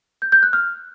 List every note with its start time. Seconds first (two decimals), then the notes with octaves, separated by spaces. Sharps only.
0.22 G6
0.32 G6
0.43 F#6
0.53 F6